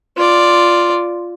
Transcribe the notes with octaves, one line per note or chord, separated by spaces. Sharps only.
F4 D5